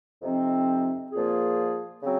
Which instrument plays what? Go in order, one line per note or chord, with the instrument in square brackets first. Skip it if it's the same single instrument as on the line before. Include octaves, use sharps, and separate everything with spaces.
[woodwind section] F2 C3 F3 C4 D#4
A#2 F3 A#3 F4 G#4
C#3 F#3 C4